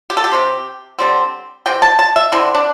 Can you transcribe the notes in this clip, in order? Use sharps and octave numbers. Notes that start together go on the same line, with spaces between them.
G4
A4
G4
C3 G3 C4
D3 G3 C4
C3 E3 C4 G5
A5
A5
E5
D3 C4 E4
D4